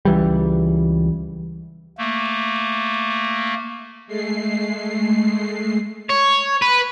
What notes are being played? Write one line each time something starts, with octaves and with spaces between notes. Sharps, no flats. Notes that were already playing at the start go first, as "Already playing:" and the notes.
C#2 E3 G3
A3 A#3
G#3 A3 C7
C#5
B4